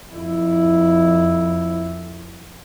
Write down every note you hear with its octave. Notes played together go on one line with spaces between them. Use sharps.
F2 E4